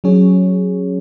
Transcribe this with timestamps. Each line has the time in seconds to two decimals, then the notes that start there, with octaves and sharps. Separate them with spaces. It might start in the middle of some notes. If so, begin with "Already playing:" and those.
0.04 F#3 C#4 G#4 C#5